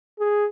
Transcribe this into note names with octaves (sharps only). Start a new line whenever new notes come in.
G#4